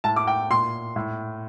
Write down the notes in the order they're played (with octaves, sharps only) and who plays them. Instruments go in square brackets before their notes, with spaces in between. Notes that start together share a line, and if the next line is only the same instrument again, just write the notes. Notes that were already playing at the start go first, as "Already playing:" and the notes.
[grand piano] A2 A5
D6
G5
A#2 C6
A2